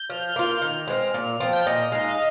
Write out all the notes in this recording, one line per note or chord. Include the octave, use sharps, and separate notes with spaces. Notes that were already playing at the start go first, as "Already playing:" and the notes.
Already playing: G6
F3 F6
A#3 F4 G6
F6
D#3
G#3 C4
A#2 F6
F3 C4
G5
A#2 D#5
G#3 D#4 F5
F5